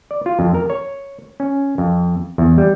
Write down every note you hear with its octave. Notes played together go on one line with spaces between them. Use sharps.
D5
F4
F2
A#4
C#5
C#4
F2
E2
G3